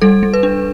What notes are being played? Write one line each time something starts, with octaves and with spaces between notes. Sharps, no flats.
G3 A4
G3
B4
D4